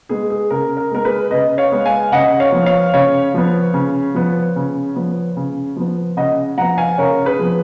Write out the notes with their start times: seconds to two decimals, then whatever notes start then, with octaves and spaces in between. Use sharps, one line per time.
0.09 G#3 B3 G#4
0.30 G#4
0.50 C#3 A#4
0.77 A#4
0.91 G#3 B3 A#4
1.05 G#4 B4
1.31 C#3 B4 D#5
1.58 C#5 F5
1.72 G#3 B3
1.86 F5 G#5
2.12 C#3 D#5 F#5
2.40 C#5 F5
2.52 F3 B3
2.66 C#5 F5
2.93 C#3 C#5 F5
3.34 F3 B3
3.74 C#3
4.15 F3 B3
4.56 C#3
4.96 F3 B3
5.36 C#3
5.76 F3 B3
6.17 C#3 D#5 F#5
6.58 F3 B3 F#5 A#5
6.78 F5 G#5
6.98 C#3 A#4 C#5
7.25 G#4 B4
7.39 F3 B3